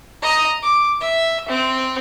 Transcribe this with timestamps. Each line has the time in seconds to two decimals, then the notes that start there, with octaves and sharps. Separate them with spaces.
0.22 D#5 A#5
0.63 D6
1.00 E5
1.48 C4